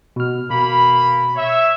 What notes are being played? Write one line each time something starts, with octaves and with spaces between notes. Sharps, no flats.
B2 F6
B2 A#3 B5
C#5 E5